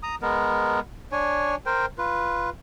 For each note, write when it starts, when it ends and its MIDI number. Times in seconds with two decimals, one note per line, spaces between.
0.03 0.15 82
0.03 0.15 87
0.22 0.80 56
0.22 0.80 59
0.22 0.80 70
1.12 1.55 62
1.12 1.55 73
1.12 1.55 80
1.66 1.86 70
1.66 1.86 72
1.66 1.86 79
1.98 2.50 65
1.98 2.50 71